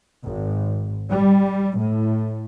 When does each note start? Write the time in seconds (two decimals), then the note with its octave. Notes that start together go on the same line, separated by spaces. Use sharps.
0.24 G#1
1.09 G3
1.76 A2